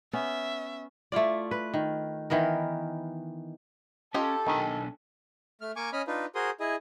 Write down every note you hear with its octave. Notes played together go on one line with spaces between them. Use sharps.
B3 C#4 E5
A3 E4 F4 D5
B4
D#3
D#3 E3 B3 A#4
C#4 F4 G4 A4 D#5
B1 D#3 D4 G#5
A3 F6
A#3 G#5 C#6 D6
C#4 D#5 B5 F6
D4 D#4 F4 B4
F#4 G#4 A#4 C5 C6 D#6
E4 G#4 D#5